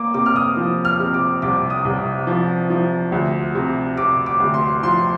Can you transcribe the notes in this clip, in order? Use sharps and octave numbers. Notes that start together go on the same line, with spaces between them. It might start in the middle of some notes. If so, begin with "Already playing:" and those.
Already playing: A#3 D6
C3 D6
F6
D#6
F3
F6
C3
D6
C2 D6
D#6
C2
F3
F3
D2
C3
C3 D6
D6
D2
C6
F3 C6